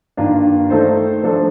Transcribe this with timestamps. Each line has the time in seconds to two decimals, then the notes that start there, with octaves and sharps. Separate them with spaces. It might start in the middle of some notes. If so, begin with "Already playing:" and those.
0.17 G2 D#3 A#3 D4 F4
0.70 D#3 A3 D#4 A4 C5
1.23 F3 A3 D4 A4